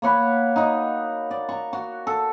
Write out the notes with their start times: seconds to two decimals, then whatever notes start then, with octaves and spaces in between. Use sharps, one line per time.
0.02 A#3 C#5 F#5 B5
0.56 D#4 F#4 D#5
1.31 D5
1.49 A#5 C#6
1.73 F#4
2.07 A4